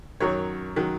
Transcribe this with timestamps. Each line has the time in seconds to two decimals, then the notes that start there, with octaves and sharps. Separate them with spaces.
0.20 F#2 D#3 F#3 C#5
0.76 D#3 F#3